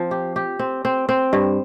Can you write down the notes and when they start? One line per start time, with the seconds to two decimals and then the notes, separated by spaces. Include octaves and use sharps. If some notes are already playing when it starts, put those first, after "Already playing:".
Already playing: F3 C4
0.11 G4
0.36 G4
0.59 C4
0.85 C4
1.09 C4
1.33 G2